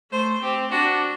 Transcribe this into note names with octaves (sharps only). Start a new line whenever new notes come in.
A3 C5
C4 G4
D4 F#4